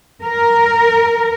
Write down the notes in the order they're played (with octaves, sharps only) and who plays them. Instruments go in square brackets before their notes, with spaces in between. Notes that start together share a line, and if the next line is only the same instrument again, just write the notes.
[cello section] A#4